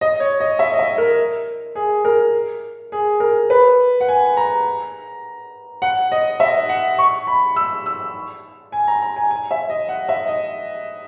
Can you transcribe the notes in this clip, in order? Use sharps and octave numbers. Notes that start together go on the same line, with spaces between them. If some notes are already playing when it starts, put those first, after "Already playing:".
D#5
C#5
D#5
E5
D#5
E5
A#4
G#4
A#4
G#4
A#4
B4
F#5
G#5
A#5
F#5
D#5
E5
F#5
C#6
B5
E6
E6
G#5
A#5
A#5
G#5
G#5
E5
D#5
F#5
E5
D#5